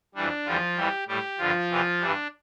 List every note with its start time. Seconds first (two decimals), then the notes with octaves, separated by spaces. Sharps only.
0.15 F2 E3 G3 D4
0.46 E2 D3 F3 G3 F4
0.76 F2 E3 G3 G4
1.07 A2 G3 G4
1.38 G2 D3 F3 F4
1.70 E2 C3 E3
2.01 G2 E3 G3 D4